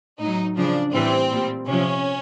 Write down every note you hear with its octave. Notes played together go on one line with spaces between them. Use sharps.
A2 F#3 D#4
C#3 F3 D4
A2 E3 G3 C4
A#2 G3
C3 F3 C#4